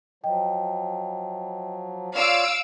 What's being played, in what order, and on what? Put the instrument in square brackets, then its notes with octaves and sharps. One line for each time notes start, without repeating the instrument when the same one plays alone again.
[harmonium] F3 F#3 [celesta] D#5 G5
[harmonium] F4 C#5 D5 [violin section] F5 E6 D7